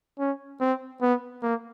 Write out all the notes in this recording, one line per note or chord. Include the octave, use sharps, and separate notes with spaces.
C#4
C4
B3
A#3